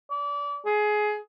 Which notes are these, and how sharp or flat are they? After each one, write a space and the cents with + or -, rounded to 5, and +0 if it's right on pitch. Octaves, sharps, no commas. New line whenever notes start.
D5 -30
G#4 +20